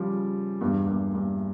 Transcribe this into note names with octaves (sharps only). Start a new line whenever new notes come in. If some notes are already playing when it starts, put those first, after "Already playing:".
Already playing: C#3 F3 G3
E2 G2
G2 A#2
G2 A#2